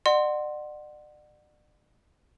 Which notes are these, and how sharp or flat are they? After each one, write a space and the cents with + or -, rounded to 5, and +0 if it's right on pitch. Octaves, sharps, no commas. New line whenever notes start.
D5 +40 F#5 +0 C6 +0